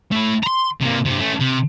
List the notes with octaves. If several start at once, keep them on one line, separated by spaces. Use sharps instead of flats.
A3 E4
A#5 C6
C3 A#3
G2 C3
A3 C#4
C3